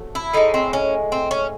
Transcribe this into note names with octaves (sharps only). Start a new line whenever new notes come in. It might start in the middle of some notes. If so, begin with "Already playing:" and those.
Already playing: C3 F#3 A3
E4
A2 G#3 D#4
C4
C#4
C4
C#4